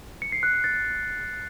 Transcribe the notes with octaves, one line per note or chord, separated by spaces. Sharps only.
C#7
C7
F#6
F#6
A6